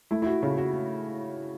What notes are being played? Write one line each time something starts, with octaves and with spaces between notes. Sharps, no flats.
A3 E4
E4
F#4
C#3 F#4
F#4